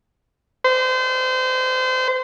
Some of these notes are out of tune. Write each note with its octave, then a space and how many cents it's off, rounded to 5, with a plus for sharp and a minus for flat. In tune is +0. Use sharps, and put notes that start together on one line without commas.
C5 -30